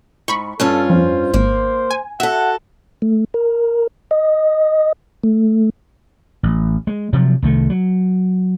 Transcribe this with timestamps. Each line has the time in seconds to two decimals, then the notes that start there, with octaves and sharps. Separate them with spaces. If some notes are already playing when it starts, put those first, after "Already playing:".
0.28 G#2 B5 C#6
0.60 G2 C#4 F4 A4
0.90 F2 C5
1.34 G#1 A#3
1.91 G#5
2.20 F#4 A4 E5 F#5
3.02 A3
3.34 A#4
4.11 D#5
5.24 A3
6.43 A1
6.87 G#3
7.13 C3 F3 F#3
7.42 C2 D#3 A3
7.70 F#3